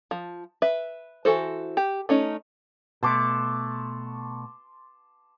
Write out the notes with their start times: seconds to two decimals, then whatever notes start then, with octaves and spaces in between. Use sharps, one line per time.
0.11 F3
0.62 B4 E5
1.25 E3 F#4 A4 C5
1.77 G4
2.09 A3 C#4 D#4
3.03 B2 A3 A5 C6 D6